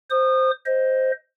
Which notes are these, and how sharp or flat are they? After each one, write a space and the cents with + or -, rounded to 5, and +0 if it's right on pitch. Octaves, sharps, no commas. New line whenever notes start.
C5 +0 D#6 -30
C5 +0 D#5 +10